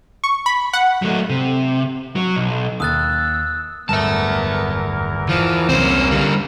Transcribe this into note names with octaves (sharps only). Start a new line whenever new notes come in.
C#6
B5
F#5
F#3 A3
C3
F#3
B1
D#2 D#6 E6 F#6 A6
D1 E2 G2 B3 A#4 E5 A5
E3 F3
C2 F#3 C4 C#4 C5
D3 G3 A#3